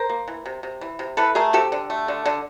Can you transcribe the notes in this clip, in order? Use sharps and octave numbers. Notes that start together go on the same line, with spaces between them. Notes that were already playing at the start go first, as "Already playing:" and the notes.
Already playing: A#4 C5
A#3
E3
C3
C3
E3
C3
E3 A4 B4
A3 G#4 A#4
C3 G4 A4
D3
A3
D3
D3